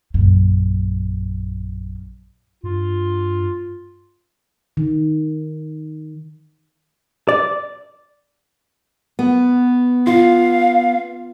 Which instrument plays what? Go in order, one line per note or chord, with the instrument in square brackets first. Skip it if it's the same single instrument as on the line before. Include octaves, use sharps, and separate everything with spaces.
[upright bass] A#1 F#2
[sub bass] G2 [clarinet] F4
[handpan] D#3
[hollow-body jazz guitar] D5
[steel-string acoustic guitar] B3
[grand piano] F4 [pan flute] F5